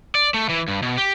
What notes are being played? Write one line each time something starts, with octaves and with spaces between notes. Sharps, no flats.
D5
A3
E3
G2
B2
G4